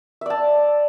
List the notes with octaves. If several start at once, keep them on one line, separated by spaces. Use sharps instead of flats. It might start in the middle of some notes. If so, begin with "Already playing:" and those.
D5 E5 A5